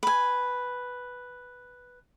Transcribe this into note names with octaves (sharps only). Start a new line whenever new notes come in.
B4 G#5